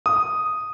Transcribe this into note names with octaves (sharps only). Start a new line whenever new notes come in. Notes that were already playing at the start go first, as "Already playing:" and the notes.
D#6